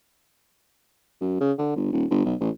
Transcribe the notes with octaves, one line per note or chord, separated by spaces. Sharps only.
F#2
C#3
D3
G1
D#1
G1
B1
A1